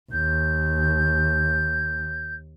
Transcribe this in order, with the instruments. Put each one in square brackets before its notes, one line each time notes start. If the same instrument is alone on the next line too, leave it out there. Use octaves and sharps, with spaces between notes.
[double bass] D#2 [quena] G6